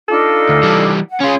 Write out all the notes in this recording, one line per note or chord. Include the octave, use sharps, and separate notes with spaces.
D4 D#4 F4 A4
D2
E3 G3
F#5
C#4 F4 G#4 C6